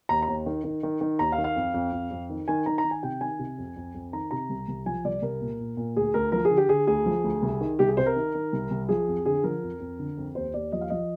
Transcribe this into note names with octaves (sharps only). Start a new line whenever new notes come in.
D#2 A#5
A#5
D#2
D#3
D#3
D#3
D#3
D#2 A#5
F5
D#3
F5
F2
F2
F2
F2
D#3
D#3 G#5
D#3 A#5
A#5
D#3
G#5
C3 G5
D#3 G#5
C3
F2
F2
F2
D#3 A#5
C3 A#5
C2
C2
F3 G#5
C2 D5
C2 A#4
A#2
A#2
A#2
D2 G#4
D2 A#4
F3 A#4
G#4
D3
G4
D3 G#4
D2 G#4
F3
D2
C2
D#3
C2 G4
G#4
C3 C5
A#4
D#3
D#3
C2
C2
F3 G#4
F2
D3 G#4
F3 A#4
F2
F2
D3
F2
D#2 C5
D#2 D5
F3 D#5
F5
F3 D#5